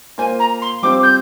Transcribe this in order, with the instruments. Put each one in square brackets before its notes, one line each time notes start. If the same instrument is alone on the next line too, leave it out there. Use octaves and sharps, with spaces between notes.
[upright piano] A#3 F4 C5 [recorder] G#5
[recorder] A#5
C6
[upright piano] G3 C4 F4 C5 [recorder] D6
[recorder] G6